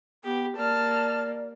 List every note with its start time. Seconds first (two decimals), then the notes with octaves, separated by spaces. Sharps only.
0.24 B3 G4
0.57 A#3 D5 A5 F6